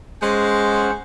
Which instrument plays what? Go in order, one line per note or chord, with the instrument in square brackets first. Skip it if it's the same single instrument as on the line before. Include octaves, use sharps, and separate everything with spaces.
[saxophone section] G#3 [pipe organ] C#4 C5 F#5